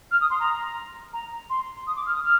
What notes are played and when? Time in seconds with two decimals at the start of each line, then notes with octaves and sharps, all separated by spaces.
0.11 F6
0.20 D#6
0.30 C6
0.39 A#5
1.13 A#5
1.49 C6
1.86 D#6
1.95 D6
2.06 F6
2.14 D#6
2.23 F6